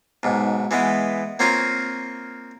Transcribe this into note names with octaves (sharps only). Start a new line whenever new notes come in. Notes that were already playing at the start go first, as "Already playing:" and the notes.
B1 G#2
E3 G#3 B3
A#3 C4 F4 C#5 G#5 A#5